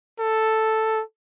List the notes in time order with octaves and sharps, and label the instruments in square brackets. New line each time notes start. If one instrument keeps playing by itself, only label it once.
[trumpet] A4